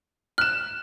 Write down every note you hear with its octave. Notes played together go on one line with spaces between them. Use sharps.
F6 F#6 E7